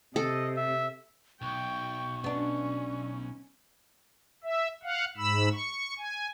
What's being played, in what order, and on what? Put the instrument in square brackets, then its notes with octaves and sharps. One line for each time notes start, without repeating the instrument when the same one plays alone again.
[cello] C3 [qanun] A4 [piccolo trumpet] D#5
[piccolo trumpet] E5
[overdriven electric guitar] B1 [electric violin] G5 [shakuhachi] C#6
[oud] B3 D4 [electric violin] C#4
[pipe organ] E5
F5 F#5
G#2 B5 E6
C#6
G#5